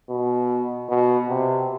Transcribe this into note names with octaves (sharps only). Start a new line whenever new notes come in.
B2
B2
C3